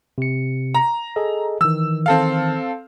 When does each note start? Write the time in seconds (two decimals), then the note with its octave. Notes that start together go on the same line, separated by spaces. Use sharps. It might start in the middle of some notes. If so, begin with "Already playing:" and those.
0.18 C3 C#7
0.75 A#5
1.16 G#4 A4 D#5
1.61 D#3 E3 E6
2.06 C4 A4 F5